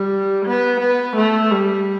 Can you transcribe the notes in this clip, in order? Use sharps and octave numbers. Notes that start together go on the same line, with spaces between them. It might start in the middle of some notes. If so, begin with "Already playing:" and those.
Already playing: G3
B3
B3
A3
G3